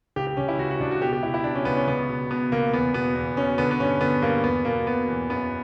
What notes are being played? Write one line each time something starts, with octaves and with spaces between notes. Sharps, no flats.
C#2 G4
G4
C#2 C#4
E4
C#2 F#4
F#4
C#2 D4
F#4
B2 G4
G4
C#2 E4
E4
B2 D4
C#4
C#2 B3
C#4
C#2 B3
B2
B2 B3
C#2 A#3
E2 B3
B2 B3
E2
B2 C#4
D3 B3
B3
G2 C#4
D3 B3
G2 A#3
E2 B3
B2 A#3
B2 B3
E2
F#2 B3